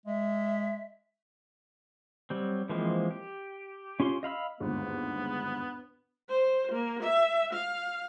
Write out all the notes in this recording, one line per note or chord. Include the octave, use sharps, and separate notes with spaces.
G#3 E5
F#3 G3 C4
E3 F3 G#3 A#3 C4
G4
C#4 F4 G4 C6
D#5 F5 B5 E6
G1 D#2 G#2 B3
C5
A#3
E5
F5